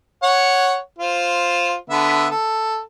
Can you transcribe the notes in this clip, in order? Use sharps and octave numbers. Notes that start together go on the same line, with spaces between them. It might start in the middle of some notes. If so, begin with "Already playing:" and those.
C#5 F#5
F4 C5
D3 B3 E5
A4